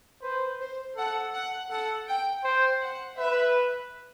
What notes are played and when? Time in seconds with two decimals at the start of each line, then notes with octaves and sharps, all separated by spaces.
0.22 B4 C5
0.61 C5
0.97 A4 F#5
1.34 F#5
1.70 A4 F#5
2.07 G5
2.44 C5 G5
2.82 F#5
3.18 B4 E5